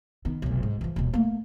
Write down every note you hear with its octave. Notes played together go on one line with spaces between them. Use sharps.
D#3 B3
F1 B1
G#2
E3 F3
D#1 B2
A3 A#3